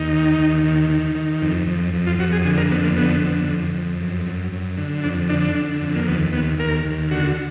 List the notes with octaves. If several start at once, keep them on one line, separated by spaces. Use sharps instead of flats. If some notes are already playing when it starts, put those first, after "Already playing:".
Already playing: D#2 D#4
D#3
D#2
D#3
D#3
D#3
F2
F2
F2
F4
F2 F#4
G#4
D3 G#4
A#4
F2 B3
A#3
D3 B3
F2
F2
F2
F#2
F#2
F#2
D3
F2 D4
D3 D4
D4
D3
F2
A#3
D#2 B3
D#2 B3
D#2 A#4
D#2
D3 F#4